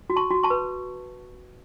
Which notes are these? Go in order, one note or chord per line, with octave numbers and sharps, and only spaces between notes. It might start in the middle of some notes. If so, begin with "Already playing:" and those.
F#4
A5 C#6
F#4
A5 C#6
B4